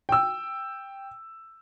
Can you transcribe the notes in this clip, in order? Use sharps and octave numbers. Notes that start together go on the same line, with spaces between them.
G5 E6